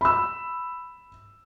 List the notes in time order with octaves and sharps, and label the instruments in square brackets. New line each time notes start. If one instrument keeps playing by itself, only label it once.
[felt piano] B5 E6